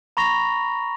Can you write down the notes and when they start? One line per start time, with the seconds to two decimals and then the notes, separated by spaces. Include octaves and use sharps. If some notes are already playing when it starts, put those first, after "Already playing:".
0.17 A#5 B5 C#6 A#6 F7